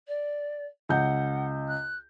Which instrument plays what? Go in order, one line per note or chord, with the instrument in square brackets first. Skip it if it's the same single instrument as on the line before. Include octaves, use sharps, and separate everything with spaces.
[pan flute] D5
[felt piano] C#2 G6 [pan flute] F#5
[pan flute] F#6